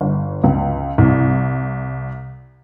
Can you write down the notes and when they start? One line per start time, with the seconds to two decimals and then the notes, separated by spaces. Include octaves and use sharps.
0.01 G1
0.44 C#2
0.98 C2